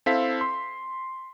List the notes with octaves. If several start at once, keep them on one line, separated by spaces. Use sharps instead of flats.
C4 E4 A4 F5 B6
C6